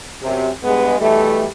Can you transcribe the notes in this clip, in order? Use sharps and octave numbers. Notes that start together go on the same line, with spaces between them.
F#2 C3
G2 G#3 B3
B2 E3 G3 A3